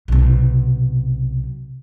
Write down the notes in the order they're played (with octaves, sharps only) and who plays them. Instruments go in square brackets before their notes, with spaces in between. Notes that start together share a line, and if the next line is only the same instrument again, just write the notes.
[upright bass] B1 C3